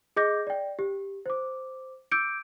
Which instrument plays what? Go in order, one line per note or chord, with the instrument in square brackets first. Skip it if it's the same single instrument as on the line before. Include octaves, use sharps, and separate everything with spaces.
[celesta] G#4 D#5 D6 G6 A#6
D5 G5
G4
C5 D6
D6 E6 G6 C#7 D7